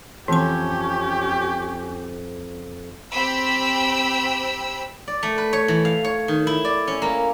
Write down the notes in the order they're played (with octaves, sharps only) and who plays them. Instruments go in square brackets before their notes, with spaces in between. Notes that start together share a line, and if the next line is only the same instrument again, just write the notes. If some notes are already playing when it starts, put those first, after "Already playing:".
[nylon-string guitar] F2 [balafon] E3 C6 [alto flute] C#4 [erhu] G4
[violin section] C4 G4 G5 B5 E6
[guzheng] D5
A3
B4
C#5
E3
F5
C#5
D#3
E4
D5
C#4
A#3